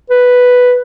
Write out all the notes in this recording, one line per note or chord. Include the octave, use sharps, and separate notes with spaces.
B4